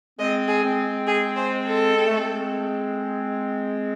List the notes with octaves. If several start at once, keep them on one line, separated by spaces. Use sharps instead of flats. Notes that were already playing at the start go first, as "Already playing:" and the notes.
G#3 C4 D#5
G#4
G#3 C4
G#4
C5
A4
C4
A3
G#3 C4